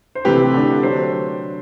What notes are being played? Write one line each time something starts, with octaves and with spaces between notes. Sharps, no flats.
C5
C3 E3 A3 C4 G4 B4
D3 A3 D4
F#3 A3 D4 C5